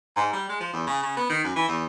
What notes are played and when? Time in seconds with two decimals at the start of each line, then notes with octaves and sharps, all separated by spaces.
0.16 G#2
0.33 G3
0.49 G#3
0.60 F3
0.73 E2
0.87 C#3
1.03 C#3
1.17 B3
1.29 D#3
1.44 F#2
1.56 E3
1.68 E2